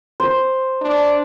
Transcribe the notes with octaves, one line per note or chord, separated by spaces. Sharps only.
C5
D4